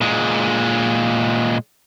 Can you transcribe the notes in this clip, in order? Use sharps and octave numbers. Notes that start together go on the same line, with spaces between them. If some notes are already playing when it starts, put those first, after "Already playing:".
A#2 G#3